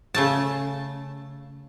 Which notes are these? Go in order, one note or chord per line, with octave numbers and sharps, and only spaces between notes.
C#3 A3 A5